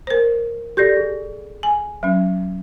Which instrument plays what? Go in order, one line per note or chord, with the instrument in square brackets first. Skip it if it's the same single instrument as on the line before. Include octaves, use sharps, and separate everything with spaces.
[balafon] A#4 C5
[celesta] G4 G6 A#6 [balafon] A4 D5
[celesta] G#4
[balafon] G#5
F#3 C#4